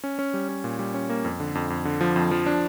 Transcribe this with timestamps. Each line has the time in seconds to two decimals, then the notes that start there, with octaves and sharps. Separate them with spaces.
0.04 C#4
0.19 C#4
0.34 G3
0.49 C#4
0.64 A#2
0.79 G3
0.94 C#4
1.10 A#3
1.25 F2
1.40 D3
1.55 F2
1.70 F2
1.85 D3
2.01 F3
2.16 F2
2.31 F3
2.46 D4